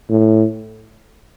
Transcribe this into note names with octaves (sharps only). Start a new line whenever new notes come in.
A2